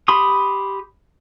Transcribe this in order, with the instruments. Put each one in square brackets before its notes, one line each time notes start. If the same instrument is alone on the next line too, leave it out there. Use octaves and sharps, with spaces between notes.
[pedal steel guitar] G4 B5 C6 D#6